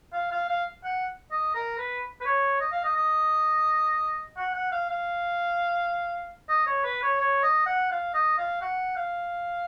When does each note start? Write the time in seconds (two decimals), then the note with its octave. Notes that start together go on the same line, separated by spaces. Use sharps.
0.13 F5
0.31 F5
0.48 F5
0.84 F#5
1.31 D#5
1.55 A#4
1.78 B4
2.21 B4
2.25 C#5
2.60 D#5
2.72 F5
2.84 D#5
2.96 D#5
4.37 F#5
4.54 F#5
4.72 F5
4.90 F5
6.49 D#5
6.66 C#5
6.84 B4
7.02 C#5
7.19 C#5
7.43 D#5
7.66 F#5
7.91 F5
8.14 D#5
8.38 F5
8.61 F#5
8.96 F5